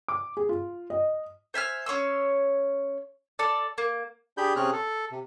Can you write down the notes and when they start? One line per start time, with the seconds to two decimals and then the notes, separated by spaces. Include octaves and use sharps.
0.08 D6
0.37 G#4
0.49 F4
0.90 D#5
1.54 C5 E5 G#5 F6
1.86 C#4 C#5 C6 E6
3.39 A4 D5
3.78 A#3
4.38 D4 G4 G#4 B5 G6
4.56 C3 C4 C#4 G#4 F6 F#6
4.73 A4
5.11 C3